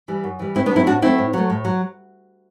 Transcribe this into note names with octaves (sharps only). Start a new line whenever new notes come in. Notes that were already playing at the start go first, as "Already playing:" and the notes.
E3 G3
F#2
E3 G3
A2 C4 E4
B3 D4
F#3 A3 C4 E4
A2 D4 F#4
F#3 A3 C4 E4
A2
F#3 A3
A2
F#3